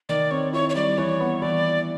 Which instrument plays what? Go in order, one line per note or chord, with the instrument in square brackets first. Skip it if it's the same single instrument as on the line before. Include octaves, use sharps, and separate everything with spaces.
[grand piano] D#3 [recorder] D5
[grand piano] C4 [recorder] C#5
[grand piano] E4 [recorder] C#5
[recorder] C#5
[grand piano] G3 [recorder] D5
[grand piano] E3 [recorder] C#5
[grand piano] B3
[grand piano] E3 [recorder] D5